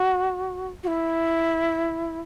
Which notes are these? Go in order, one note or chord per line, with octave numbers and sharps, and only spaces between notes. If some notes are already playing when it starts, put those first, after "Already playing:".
Already playing: F#4
F#4
E4